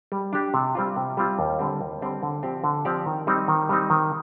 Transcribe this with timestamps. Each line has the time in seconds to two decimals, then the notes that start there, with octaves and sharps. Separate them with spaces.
0.12 G3
0.33 D4 G4
0.54 C3
0.75 G3 C4 F4
0.96 C3
1.17 G3 C4 F4
1.39 D#2
1.59 D3 G3 C4
1.81 D#2
2.01 D3 G3 C4
2.23 D3
2.43 F3 C4 G4 D5
2.64 D3
2.85 F3 C4 G4 D5
3.06 D#3
3.27 G3 C4 D#4
3.48 D#3
3.69 G3 C4 D#4
3.90 D#3